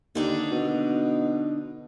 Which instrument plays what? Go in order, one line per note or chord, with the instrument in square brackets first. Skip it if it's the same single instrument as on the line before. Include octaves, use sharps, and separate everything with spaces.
[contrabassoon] D#2 [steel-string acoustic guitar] D3 D4 D#4
[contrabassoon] B2